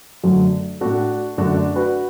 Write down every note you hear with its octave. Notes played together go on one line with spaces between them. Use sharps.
F#2 D3 F#3 A3
A2 A3 D4 F#4
F#2 D3 F#3 A3 D4 F#4
D4
F#4 B4